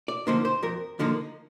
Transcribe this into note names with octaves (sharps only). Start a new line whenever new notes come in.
D5
D3 F3 A#3 D#4 C5
C5
F2 A#4
D3 F3 A#3 D#4